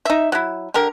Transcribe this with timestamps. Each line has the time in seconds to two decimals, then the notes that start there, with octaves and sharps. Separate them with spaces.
0.05 D#4 E5
0.32 F#3 E4
0.74 D3 G4 A#4